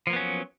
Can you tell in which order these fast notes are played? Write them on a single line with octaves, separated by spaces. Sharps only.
F3 A#3 B3 C#4 F#3